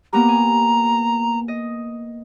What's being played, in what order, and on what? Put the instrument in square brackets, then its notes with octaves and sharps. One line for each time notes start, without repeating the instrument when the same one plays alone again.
[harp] A#3 B3 G4 [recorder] A#5
[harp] G#5
D#5